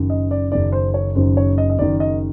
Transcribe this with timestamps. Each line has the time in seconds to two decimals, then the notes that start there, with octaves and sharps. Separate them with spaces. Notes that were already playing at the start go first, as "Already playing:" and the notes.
Already playing: F#1 F#2 D#3
0.10 D#5
0.31 D5
0.52 F#1 F#2 D#3 D5
0.72 C5
0.94 C#5
1.15 F#1 F#2 D#3 C5
1.37 C#5
1.58 D#5
1.70 D#5
1.78 F#1 F#2 D#3 D5
2.00 D#5